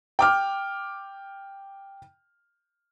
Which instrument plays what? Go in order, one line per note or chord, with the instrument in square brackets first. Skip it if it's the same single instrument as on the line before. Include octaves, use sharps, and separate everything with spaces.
[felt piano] G5 D6 F6